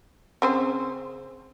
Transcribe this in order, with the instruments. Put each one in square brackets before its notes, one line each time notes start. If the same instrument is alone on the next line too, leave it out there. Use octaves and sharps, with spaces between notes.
[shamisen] C#3 C4 C5